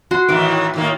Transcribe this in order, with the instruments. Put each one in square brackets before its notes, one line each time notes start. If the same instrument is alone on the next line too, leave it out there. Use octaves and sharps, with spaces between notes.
[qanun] F#4 C6
[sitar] A2 D#3 E3 [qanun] D6
[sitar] A2 D#3 A#3